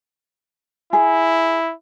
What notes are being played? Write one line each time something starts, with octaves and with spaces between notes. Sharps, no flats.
E4 G#4